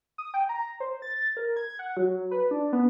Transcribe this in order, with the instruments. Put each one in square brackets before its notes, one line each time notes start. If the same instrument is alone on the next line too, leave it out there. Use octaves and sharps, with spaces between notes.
[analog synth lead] D#6
G5
A#5
C5
A6
A#4
G#6
F#5
F#3
B4
D4
B3